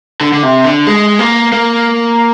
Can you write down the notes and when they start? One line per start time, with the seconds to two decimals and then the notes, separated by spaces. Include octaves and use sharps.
0.21 D3
0.32 D3
0.43 C3
0.64 D3
0.87 G#3
1.19 A#3
1.52 A#3